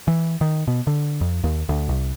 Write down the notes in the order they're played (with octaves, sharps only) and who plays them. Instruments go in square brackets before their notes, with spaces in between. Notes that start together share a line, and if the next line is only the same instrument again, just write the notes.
[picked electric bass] E3
D#3
B2
D3
F2
D#2
D2
C2